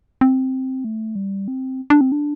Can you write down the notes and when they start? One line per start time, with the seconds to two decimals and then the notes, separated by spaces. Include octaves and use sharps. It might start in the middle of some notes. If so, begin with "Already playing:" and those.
0.21 C4
0.85 A3
1.16 G3
1.48 C4
1.90 D4
2.01 C4
2.12 D4